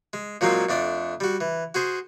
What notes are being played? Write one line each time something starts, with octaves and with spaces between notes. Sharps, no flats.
G#3
A#2 F3 F#3 G#3 A#3 C4
F2 A3 D4 D5
G3 F#4
E3
F#4 G#4 C5